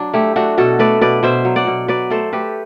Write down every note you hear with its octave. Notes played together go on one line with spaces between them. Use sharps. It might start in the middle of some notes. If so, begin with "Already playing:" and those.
Already playing: F#3 D4
A3 E4 G4
A3 D4 F#4
B2 F#4 A4
A3 B4 D5
B2 B4 D5
B2 C5 E5
F#3
D5 F#5
B2
F#3 B4 D5
A3 A4 C5
A3 G4 B4